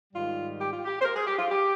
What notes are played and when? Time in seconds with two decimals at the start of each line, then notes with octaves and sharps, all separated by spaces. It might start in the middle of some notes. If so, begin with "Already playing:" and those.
0.13 G#2 D#3 G3 F4
0.59 G4
0.72 F4
0.85 G4
1.00 C5
1.04 A#4
1.15 G#4
1.27 G4
1.38 F4
1.50 G4